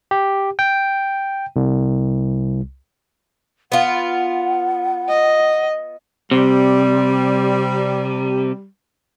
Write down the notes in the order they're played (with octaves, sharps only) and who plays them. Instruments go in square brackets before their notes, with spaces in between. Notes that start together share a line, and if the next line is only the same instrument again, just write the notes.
[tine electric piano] G4
G5
C2
[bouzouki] B3 F4 [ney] F#5
[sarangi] D#5
[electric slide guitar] C3 [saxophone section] G3